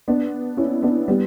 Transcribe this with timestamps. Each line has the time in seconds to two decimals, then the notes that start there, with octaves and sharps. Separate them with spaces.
0.08 B3 D4
0.57 C#4 E4
0.82 B3 D4
1.08 G3 B3